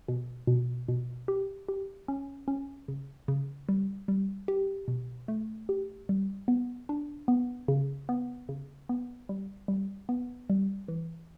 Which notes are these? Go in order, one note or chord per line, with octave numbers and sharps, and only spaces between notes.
B2
B2
B2
G4
G4
C#4
C#4
C#3
C#3
G3
G3
G4
B2
A3
G4
G3
B3
D4
B3
C#3
B3
C#3
B3
G3
G3
B3
G3
E3